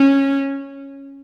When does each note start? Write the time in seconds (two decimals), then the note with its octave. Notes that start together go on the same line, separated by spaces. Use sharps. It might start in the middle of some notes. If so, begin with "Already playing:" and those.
Already playing: C#4